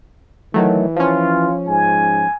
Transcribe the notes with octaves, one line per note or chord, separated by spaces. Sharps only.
D#3 E3 F#3 A3
F3 C#4 F4
G#2 G#5